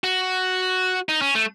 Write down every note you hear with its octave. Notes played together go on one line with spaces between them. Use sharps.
F#4
D#4
C#4
A3